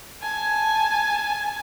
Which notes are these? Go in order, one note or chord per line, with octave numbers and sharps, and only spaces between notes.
G#5 A5